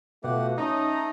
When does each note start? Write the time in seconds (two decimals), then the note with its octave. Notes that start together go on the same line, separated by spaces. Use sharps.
0.24 B2 A3 F4 G4 F#5
0.58 A3 C#4 D#4 D#5 A#5